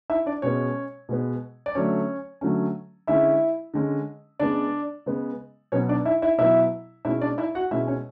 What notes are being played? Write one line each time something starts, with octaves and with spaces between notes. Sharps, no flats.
E4 E5
D4 D5
B2 G#3 B3 C#4 C#5
B2 G#3 B3
D5
D3 F#3 A3 C#4 C#5
D3 F#3 A3 C#4
D3 G#3 C#4 E4 E5
D3 G#3 C#4
C#3 G#3 B3 D4 D5
C#3 G#3 B3
B2 F#3 B3 C#4 C#5
D4 D5
E4 E5
E4 E5
B2 F#3 B3 E4 E5
B2 G#3 C#4 E4 E5
D4 D5
E4 E5
F#4 F#5
B2 G#3 C#4 E4 E5
C#4 C#5